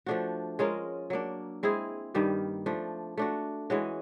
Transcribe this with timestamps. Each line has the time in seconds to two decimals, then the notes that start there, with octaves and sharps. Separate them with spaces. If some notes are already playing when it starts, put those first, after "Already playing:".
0.06 F3 A3 D4 F#4
0.59 G#3 C#4 F4 A#4
1.10 F#3 A#3 D4
1.63 G#3 C4 E4 G#4
2.14 G2 D#3 G3 A#3
2.66 F3 A3 D4
3.17 A3 D4 F#4
3.70 E3 G#3 C#4 F#4